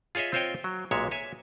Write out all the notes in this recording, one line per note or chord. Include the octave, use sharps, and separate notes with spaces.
F4 G#4 C#5 D#5 E5
C4 F4 C5 C#5 D#5 G5
F#3
B1 A#2 G#3 C#5 E5
C#5 E5 G#5